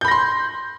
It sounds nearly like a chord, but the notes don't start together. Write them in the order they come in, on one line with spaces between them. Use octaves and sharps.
G6 B5 A#6 C6